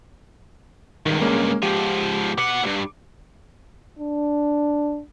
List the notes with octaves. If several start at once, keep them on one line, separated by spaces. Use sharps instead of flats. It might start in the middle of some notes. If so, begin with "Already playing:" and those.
C#2 G2 D#3
G#3 A#3 C#4
G#2 F3 G4
B2 F#5 D6
D2 G2
D4